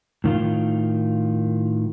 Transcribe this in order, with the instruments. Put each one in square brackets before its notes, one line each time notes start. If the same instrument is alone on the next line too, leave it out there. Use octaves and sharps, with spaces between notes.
[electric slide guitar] A2 D#3 F4